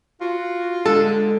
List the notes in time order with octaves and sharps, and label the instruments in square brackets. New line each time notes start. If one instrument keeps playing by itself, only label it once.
[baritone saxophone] F4 [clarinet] F#4
[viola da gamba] D3 G#3 [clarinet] D4 [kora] A4